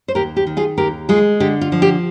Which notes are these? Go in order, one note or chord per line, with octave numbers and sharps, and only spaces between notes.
C5
D#2 G4 A#4
G4
D#3
F4 G#4
D#2 G4 A#4
G#3 F4 G#4
D3 G4
F4
F3
G4